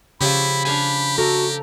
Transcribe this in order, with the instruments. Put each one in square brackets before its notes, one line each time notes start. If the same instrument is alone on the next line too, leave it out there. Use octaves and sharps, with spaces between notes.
[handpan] C#3 C#5 [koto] F3 F4 G4 [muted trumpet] E4 [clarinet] B5
[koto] D4 F5 G#5 [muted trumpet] G4
[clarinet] F#4 [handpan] A4 [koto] A#4